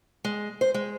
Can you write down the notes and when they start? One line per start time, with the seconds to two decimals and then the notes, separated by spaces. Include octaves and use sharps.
0.24 G#3
0.61 C5
0.74 G#3